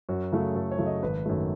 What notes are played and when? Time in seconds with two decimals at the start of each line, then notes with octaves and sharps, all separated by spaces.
0.09 F#2 F#4
0.32 C#3 F#3 A3
0.55 F#2 A4
0.71 C#5
0.79 C#3 F#3 A3
0.86 D#5
1.03 G#1 B4
1.26 F#2 D#3 F#3 A3